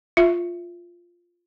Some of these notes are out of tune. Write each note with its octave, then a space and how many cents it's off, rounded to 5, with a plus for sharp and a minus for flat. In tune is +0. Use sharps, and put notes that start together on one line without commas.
F4 +0 E5 +10